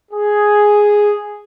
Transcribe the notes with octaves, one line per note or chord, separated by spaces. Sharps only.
G#4